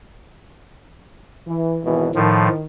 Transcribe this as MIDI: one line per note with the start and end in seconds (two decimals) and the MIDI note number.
1.46 1.77 52
1.84 2.12 32
1.84 2.12 47
1.84 2.12 52
2.15 2.48 45
2.15 2.66 51
2.15 2.48 53